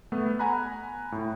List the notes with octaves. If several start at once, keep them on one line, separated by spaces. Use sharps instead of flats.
A3 B3
F#5 G#5 A#5 B5 F#6
A2